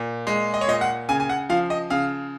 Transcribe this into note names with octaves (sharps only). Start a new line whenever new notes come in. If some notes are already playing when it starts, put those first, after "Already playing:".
Already playing: A#2
G#3
D#5
C#5
A#2 D#5
F#5
C#3 G#5
G#5
F#5
F3 F5
D#5
C#3 F5